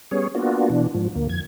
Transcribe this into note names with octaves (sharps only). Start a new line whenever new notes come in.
G3 B3 C#4 G#4 C#5
A#3 B3 D4 F4 F#4
B2 E3 D4
G#2 F3
D2 A#3
F2 G#6